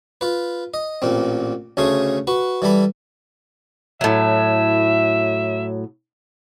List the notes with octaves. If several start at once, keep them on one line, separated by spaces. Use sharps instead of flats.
F4 B4
D#5
A1 A#2 C4
D2 C#3 A3 G#4 C6
F#4 B4
E3 G3 A4 B5
A2 F#3 E5